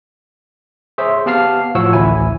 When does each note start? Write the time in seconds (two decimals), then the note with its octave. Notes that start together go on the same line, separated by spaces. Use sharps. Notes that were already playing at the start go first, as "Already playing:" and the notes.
0.98 G#4 C5 C#5 E5
1.26 B3 G4 F5 A5 F6 C7
1.75 A2 F3 F#4 C#5 F#5 E6
1.93 A1 D2 E4 G#5